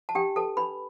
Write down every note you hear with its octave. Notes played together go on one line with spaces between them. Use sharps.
A5
D4 G4 G5
A4 B4 A5
D4 B4 B5